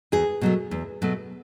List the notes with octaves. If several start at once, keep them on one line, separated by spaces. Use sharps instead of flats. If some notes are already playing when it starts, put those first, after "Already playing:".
E2 G#4
B2 F#3 A3
E2
B2 F#3 A3